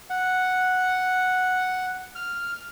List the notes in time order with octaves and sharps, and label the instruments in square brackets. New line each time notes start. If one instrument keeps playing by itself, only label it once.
[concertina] F#5
F6